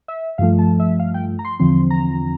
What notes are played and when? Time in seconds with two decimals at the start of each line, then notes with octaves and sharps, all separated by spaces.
0.08 E5
0.38 G2 F3 A3 F5
0.59 A5
0.80 E5
1.00 F5
1.14 G5
1.39 A#5
1.45 C6
1.59 E2 D3 F3 C4 C6
1.91 A#5